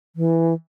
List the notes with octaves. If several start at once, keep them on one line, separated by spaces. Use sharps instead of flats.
E3